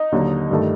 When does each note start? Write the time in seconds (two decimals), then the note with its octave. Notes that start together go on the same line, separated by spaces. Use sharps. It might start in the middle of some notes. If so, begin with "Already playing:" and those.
Already playing: D#4
0.12 D#2 D3 F#3
0.50 G2 D#3 A3